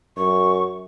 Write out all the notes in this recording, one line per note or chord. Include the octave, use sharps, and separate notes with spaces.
F#2 C#6